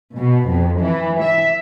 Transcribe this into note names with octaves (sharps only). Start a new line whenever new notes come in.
B2
F2
E3
E5